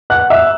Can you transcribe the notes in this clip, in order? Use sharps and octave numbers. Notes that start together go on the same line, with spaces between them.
F#5 F#6
E5 E6